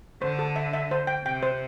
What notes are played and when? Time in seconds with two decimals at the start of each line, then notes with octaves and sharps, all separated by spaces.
0.22 D3 C5
0.39 A4
0.56 E5
0.73 E5
0.91 C5
1.07 G5
1.25 C3 G5
1.43 C5